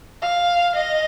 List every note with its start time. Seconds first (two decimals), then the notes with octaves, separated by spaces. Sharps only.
0.22 F5
0.76 D#5